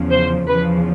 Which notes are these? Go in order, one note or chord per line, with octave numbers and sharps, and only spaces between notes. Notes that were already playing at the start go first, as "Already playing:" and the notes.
Already playing: E2 C#3 F3
C5
E2 C#3 F3 B4